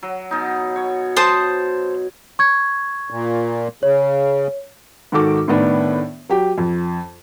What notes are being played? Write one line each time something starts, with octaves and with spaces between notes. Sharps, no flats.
F#3
B2 D#4
C#5
C5 A5 D#6
C#6 G#6
A#2
C#3 C#5
G#2 D#3 F#4 A4 D6
A2 D#3 B3 D4
F#3 G4
F2